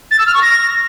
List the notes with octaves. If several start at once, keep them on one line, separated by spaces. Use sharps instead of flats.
A6
E6
F6
C#6
A#6